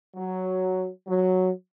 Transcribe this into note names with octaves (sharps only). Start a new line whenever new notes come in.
F#3
F#3